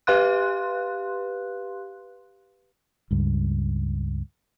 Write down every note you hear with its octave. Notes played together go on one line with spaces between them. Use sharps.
G4 B4 F5 C6 F#6
C#2 G2